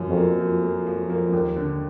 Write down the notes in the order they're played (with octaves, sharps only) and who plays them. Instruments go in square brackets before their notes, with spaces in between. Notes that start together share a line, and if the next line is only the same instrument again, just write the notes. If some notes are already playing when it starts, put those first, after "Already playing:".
Already playing: [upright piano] F#2 F3 A#3
[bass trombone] F2
[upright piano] A#3
[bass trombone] F2 [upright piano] F3
[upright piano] A#3
F3
A#3
D#2
D3